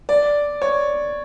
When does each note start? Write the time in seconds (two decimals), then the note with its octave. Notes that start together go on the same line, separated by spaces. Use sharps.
0.09 D5
0.62 C#5